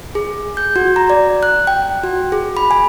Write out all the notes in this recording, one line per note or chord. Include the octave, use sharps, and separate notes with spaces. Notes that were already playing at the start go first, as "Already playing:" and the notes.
G#4
G6
F#4
A#5
D5
F#6
G5
F#4
G#4
B5
G#5